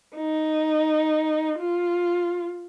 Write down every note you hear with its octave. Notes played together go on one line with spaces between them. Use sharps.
D#4
F4